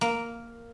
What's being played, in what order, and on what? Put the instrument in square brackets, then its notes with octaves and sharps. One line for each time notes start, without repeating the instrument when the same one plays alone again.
[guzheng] A#3